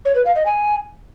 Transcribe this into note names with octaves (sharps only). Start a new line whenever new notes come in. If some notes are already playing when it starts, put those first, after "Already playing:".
C#5
B4
F5
D#5
G#5